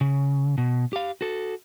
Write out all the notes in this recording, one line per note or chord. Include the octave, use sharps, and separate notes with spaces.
C#3
B2
G4 F5
F#4 A4